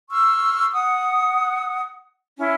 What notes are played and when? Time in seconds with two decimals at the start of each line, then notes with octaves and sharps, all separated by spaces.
0.10 C6 C#6 E6 F6
0.72 F#5 D#6
2.38 C#4 E4